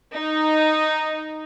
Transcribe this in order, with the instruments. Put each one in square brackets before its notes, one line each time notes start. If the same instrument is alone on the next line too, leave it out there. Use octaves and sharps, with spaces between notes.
[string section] D#4